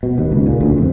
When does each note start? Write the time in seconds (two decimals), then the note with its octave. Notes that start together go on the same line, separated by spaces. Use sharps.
0.03 B2
0.18 D#2
0.31 C#2
0.46 A#2
0.60 D2
0.78 F2